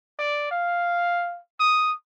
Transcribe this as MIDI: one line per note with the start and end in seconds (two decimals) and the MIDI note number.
0.19 0.48 74
0.51 1.39 77
1.60 1.93 87